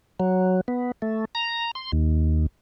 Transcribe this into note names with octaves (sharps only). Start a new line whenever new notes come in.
F#3
B3
A3
A#5
C6
D#2